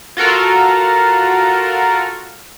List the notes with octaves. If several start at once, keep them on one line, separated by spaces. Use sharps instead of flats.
F4 F#4 A4 A#4